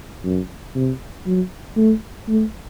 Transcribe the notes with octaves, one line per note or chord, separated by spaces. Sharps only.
F#2
C3
F#3
A3
A3